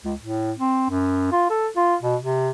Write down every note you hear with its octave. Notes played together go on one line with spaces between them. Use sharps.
C#2
A2
C4
F#2
F4
A4
F4
B2
C3